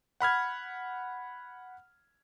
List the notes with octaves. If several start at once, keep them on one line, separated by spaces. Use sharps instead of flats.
F#5 B5 F6 G#6